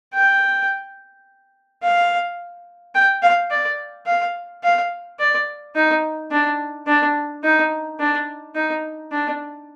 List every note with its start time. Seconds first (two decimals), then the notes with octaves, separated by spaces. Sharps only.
0.14 G5
1.83 F5
2.95 G5
3.23 F5
3.51 D5
4.07 F5
4.63 F5
5.19 D5
5.75 D#4
6.31 D4
6.87 D4
7.44 D#4
7.99 D4
8.55 D#4
9.12 D4